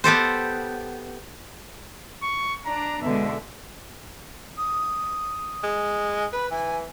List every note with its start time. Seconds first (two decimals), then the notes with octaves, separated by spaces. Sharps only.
0.04 B3 G4 A4 C5
2.23 C#6
2.66 D4 A#5
3.02 B2 D3 G#3 E5
4.57 D#6
5.64 G#3
6.33 B4 B5
6.51 E3 G#5